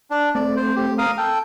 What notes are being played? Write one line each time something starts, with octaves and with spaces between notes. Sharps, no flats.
D4
A3 C4 D5
C5
G4
A#4 F5 D#6
A4 G5